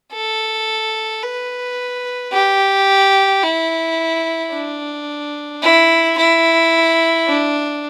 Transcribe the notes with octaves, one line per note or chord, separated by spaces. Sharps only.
A4
B4
G4
E4
D4
E4
E4
D4